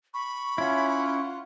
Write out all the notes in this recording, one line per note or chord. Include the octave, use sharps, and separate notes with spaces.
B5 C#6
C#4 E4 F4 F#5